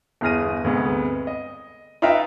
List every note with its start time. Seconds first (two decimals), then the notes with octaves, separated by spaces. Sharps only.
0.21 G1 E2 G#4 F6 A#6 D#7
0.64 D2 G2 C3 G#3 B3
1.27 D#5
2.02 D#4 F4 B4 E5 G5 A#5